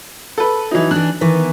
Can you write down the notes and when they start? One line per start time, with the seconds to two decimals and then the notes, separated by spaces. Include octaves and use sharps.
0.38 A4 B4
0.71 E3 F#3 D#4
0.91 E3 D4 F#6
1.21 D#3 E3 B3